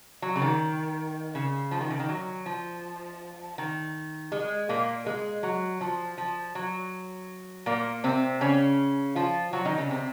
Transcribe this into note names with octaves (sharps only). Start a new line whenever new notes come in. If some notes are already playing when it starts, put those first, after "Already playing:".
F#3
C#3
D#3
C#3
F3
D#3
C#3
D#3
F#3
F3
D#3
G#3
A#2 A#3
G#3
F#3
F3
F3
F#3
A#2 A#3
C3 C4
C#3 C#4
F3 F4
F#3 F#4
D#3 D#4
C#3 C#4
C3 C4